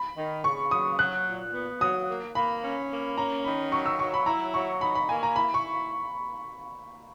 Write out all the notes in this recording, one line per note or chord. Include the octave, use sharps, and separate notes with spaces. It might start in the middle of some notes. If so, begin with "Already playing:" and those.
Already playing: B5
D#3
C#3 C#6
F#3 D#6
F#3 F#6
A#2
B3
F#3 D#6
A#3
A#3 B5
C#4
A#3
C#4 A#5
D#3 B5
F#3 C#6
E6
F#3 C#6
B5
E4 A#5
F#3 C#6
D#4 B5
B5
A#3 G#5
A#5
E4 B5
C#6